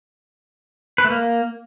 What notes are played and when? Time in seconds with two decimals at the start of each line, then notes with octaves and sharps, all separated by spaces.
0.98 B4
1.04 A3
1.11 A#3